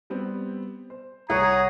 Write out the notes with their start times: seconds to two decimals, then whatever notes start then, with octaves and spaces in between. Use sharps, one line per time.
0.10 G3 B3 C4
0.90 C5
1.30 C2 G#4 C#5 F#5 A#5